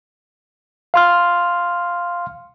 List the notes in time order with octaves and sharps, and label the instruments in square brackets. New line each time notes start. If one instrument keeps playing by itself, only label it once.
[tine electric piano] F5 C6 F6